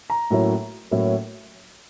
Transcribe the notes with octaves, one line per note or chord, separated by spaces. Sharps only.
A#5
A2 F#3 A#3 C#4 E4
A2 F#3 A#3 C#4 E4